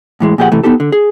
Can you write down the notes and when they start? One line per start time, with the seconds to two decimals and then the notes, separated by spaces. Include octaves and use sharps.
0.20 A2 E3 G#3
0.38 A#2 F3 G4 G#4 C#5 F#5
0.52 C3 E3 A3
0.64 B3 C4 D#4 G4 A4
0.80 D3
0.92 G#4